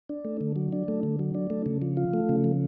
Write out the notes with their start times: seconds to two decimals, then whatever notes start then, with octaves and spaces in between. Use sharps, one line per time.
0.09 D4
0.25 A3
0.41 D3
0.56 F#3
0.72 D4
0.88 A3
1.03 D3
1.19 F#3
1.34 D4
1.50 A3
1.66 C#3
1.82 F3
1.97 F4
2.14 A3
2.29 C#3
2.44 F3